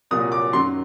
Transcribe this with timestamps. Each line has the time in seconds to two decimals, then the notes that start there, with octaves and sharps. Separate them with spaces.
0.11 C2 A#2 F#3 D#6
0.32 D6
0.53 F#2 D#3 F#3 C6